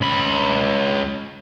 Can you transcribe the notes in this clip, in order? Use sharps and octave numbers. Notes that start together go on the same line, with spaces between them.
C#2 B5